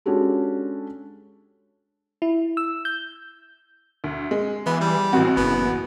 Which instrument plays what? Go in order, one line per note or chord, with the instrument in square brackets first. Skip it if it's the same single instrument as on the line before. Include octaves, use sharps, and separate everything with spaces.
[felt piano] G#3 C#4 D4 F#4 G4 A4
[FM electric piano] E4
E6
G6
[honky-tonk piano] D2
G#3
[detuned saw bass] E3 [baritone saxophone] B3
[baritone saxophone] G3
[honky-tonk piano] A1 F#4 [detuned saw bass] C4
[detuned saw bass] F#1 [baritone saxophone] B3